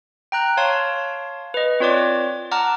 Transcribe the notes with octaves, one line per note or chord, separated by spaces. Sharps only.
G5 A#5 F#6
C#5 F5 A5 C6
B4 D#5
C4 F4 C#5 D5 D6
F#5 A5 A#5 D6 F6